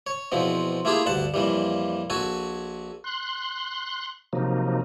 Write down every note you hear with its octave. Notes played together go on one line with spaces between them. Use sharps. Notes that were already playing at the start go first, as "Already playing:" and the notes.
C#5
E2 B2 F3 C4
A3 A#3 E4 F4 G4 G#4
D2 G2 F#5 A5
F2 A#2 E3 G3
A#1 F#4 A4 G#5
C6 F#6
C3 F3 F#3 A#3 D#4